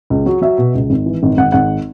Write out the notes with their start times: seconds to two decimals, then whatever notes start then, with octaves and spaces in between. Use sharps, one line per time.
0.10 C#2
0.26 F#3
0.42 F#3 E5
0.58 B2
0.75 C#2
0.90 G#1
1.06 E3
1.23 G#1
1.38 G#1 F#5
1.52 G#1 F#5